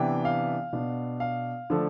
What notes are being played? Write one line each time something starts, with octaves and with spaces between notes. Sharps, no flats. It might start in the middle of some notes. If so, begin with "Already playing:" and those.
Already playing: C3 E3 B3 D4 G5
F5
B2 B3 D4
F5
D3 F3 A3 D4